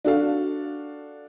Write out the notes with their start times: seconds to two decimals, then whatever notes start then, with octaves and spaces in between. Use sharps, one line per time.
0.04 D4 F#4 A4 F5